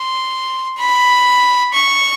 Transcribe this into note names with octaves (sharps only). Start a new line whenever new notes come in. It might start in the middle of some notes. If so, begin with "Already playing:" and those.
Already playing: C6
B5
C#6